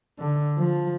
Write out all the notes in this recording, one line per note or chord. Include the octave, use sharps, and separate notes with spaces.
D3
F3